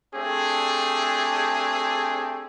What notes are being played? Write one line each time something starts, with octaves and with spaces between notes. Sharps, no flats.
A3 C4 D4 G4 G#4